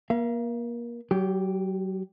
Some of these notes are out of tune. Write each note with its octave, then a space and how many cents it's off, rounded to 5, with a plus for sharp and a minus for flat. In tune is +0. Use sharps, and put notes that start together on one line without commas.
A#3 +30 F5 -40
F#3 +30 G4 +0